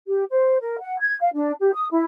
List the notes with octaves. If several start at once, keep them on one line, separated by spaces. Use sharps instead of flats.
G4
C5
A#4
F#5
G#6
F5
D4
G4
D#6
E4